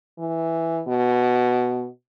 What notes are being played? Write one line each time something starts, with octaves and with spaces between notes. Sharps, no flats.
E3
B2